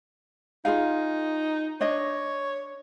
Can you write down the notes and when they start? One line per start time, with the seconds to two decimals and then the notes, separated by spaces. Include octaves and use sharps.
0.65 D#4 F4 G#4 F5
1.81 D4 C#5 D#5